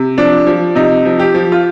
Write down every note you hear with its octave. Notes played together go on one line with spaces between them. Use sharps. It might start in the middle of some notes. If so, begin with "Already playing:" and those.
Already playing: C3
F3 D4
F3
C3 D#4
F3
G4
F3
F4